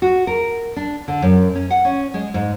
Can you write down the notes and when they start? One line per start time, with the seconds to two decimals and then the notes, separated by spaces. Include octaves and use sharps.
0.02 F#4
0.27 A#4
0.76 D4
1.08 D3
1.22 F#2
1.55 C#4
1.70 F#5
1.85 C#4
2.14 G#3
2.34 G#2